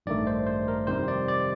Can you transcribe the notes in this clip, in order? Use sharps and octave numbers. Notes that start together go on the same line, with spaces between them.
A1 G2 D#3 A3 D5
C5
C5
A#4
F2 C3 D#3 G3 C5
D5
D5